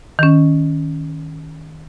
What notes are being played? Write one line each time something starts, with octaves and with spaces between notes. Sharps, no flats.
D#3 C#4